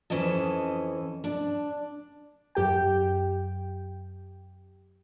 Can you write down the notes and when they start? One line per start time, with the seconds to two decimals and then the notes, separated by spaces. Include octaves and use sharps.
0.10 F2 E3 C#4 D#5 A5
1.24 D4
2.55 F#2 G4 G5